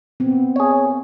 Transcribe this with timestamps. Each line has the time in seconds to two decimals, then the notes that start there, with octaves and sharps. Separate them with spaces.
0.20 B3 C4
0.56 G#4 C#5